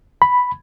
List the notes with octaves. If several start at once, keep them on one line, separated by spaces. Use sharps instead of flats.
B5